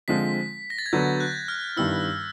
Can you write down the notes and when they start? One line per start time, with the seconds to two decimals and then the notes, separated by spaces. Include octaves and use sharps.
0.08 D3 F3 G#3 C4 F4 B6
0.70 A#6
0.78 A6
0.86 G#6
0.93 D3 F#3 B3 G6
1.20 F#6
1.48 F6
1.77 G2 D#3 G3 B3 E4 E6